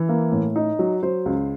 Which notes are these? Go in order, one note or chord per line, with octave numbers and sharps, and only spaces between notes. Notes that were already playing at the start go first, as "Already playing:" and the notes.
Already playing: E3
A#3
A2
D#4
F#3
F#3 C5
C#2